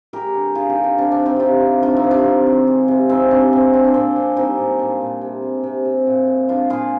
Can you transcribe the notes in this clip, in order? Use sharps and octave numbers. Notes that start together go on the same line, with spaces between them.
G#3 G4 A#4
D3
D3 F4 G#4
D#4 G4
D3
D4
C3 D4
D4
D#3
C4 D#4
C3 D4 F4 G4
C3
D#3 D4 F4
C4 D#4
C3
D4 F4
C3
D#3
G#3
C3
G#3 C4 D#4
C3 D4
A#2 C4
G#3 D4
D4
A#2 C4
G#3 D4
G3 C4 D#4
A#2
A#2 D4
A#2
C3
G#3
C3
C3
A#2
G#3
G#3 D4 F4
A#2 F4 G#4